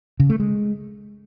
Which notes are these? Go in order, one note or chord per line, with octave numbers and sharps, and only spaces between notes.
C#3
A3
G#3